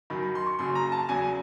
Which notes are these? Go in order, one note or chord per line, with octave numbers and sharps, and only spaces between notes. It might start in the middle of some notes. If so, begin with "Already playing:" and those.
F#2 D#3 F#3 B5
B5
C6
C#6
F#1 F#2 C#3 F#3 C6
A#5
A5
E2 C#3 F#3 G#5